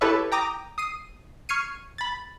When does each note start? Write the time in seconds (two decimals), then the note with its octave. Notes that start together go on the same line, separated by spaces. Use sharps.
0.01 E4 G4 A4 B4 C#5 E5
0.32 G5 A#5 D6 D#6 A#6
0.78 D#6 C7 D#7
1.49 C#6 F6 G#6 C7 C#7 D#7
1.98 B5 A6